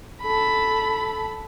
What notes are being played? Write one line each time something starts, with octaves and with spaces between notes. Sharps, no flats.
A4 B5